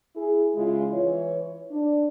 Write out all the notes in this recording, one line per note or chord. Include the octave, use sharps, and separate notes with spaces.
E4 G#4
C#3 G#3 E4 F4
E3 C#5
D4